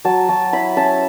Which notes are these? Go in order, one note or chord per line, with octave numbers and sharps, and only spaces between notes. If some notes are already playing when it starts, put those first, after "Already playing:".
F#3 A5
F#3 A5
E4 B5
C#4 A5